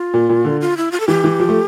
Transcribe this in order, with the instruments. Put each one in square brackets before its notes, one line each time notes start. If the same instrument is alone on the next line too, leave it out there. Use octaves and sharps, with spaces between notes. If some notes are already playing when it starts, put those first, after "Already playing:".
Already playing: [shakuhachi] F4
[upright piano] A#2
A#2
D3
[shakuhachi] F4
E4
F4
A4
[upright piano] E3 [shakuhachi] G4
[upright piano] E3
F3
A3